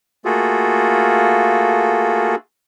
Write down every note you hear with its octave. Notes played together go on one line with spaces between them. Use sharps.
A3 A#3 F4 F#4 G#4 A4